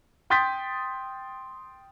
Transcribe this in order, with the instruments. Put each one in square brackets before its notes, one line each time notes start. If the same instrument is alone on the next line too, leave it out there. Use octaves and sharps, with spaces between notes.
[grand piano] G5 C6 D#6 G6 A6 B6